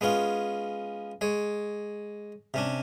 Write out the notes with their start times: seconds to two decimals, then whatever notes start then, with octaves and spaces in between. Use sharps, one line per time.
0.01 G#3 B3 C#4 F4
1.21 G#3 C#5
2.54 C3 C#4 D4